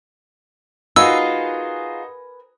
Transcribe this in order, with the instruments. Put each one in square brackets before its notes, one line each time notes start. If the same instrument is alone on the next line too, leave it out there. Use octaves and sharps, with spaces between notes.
[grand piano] D#4 F#4 [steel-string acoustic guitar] F4 G#4 [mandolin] A#4 B4 G#5 [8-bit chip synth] E6